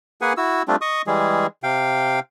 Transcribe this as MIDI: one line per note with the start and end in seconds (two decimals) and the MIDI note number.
0.21 0.33 58
0.21 0.33 68
0.21 0.33 71
0.21 0.33 78
0.21 0.33 80
0.37 0.63 64
0.37 0.63 66
0.37 0.63 88
0.68 0.76 55
0.68 0.76 57
0.68 0.76 60
0.68 0.76 62
0.68 0.76 65
0.81 1.02 75
0.81 1.02 85
0.81 1.02 87
1.07 1.47 52
1.07 1.47 55
1.07 1.47 56
1.07 1.47 68
1.63 2.20 48
1.63 2.20 77
1.63 2.20 79